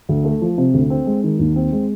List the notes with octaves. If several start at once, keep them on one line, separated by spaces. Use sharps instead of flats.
D2
A3
F3
C3
D2
C4
G#3
D#3
D#2
C4
G#3